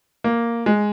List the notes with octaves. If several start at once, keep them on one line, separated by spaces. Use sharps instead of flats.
A#3
G#3